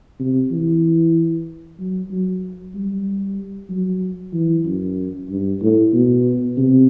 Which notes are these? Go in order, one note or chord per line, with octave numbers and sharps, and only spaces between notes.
C3
E3
F#3
F#3
G3
F#3
E3
F#2
G2
A2
B2
C3